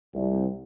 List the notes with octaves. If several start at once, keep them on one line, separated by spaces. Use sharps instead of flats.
C2